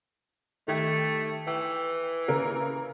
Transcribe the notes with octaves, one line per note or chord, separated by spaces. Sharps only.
D#3 A3 G4 G#6
E3 G5
C#3 A#3 A#4